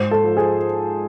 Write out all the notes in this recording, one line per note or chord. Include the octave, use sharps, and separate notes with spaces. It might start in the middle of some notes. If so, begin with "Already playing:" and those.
Already playing: G#2 C5
A4
F3
G#4